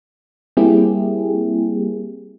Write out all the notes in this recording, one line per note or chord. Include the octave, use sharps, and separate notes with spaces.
G3 A#3 C4 E4 G4 G#4